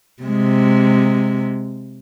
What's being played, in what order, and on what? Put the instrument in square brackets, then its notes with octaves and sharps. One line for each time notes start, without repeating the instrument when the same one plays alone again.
[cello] C3 G#3